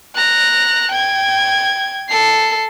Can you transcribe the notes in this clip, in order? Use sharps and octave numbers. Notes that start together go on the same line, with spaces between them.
A#5 F#6
G5 G#6
A4 C7